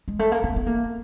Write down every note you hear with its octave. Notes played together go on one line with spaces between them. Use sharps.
G#3
A3
A#3
B3
B3
A#3